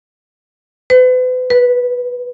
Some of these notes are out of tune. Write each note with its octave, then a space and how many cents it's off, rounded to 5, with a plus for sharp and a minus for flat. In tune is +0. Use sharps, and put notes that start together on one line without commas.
B4 +40
B4 -10